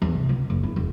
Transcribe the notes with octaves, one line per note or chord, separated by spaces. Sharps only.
E2
C3
C#2
F#1
E4
E1